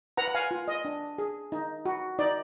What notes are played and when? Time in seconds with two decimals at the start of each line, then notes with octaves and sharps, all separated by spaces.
0.17 B4 F#5 A#5
0.28 F#5
0.34 F5 G#5
0.51 F4
0.68 D#5
0.85 D4
1.18 G#4
1.52 D#4
1.85 F#4
2.19 D#4 D5